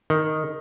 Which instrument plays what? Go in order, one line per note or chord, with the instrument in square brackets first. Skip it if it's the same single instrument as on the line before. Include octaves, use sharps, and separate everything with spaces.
[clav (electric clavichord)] D#3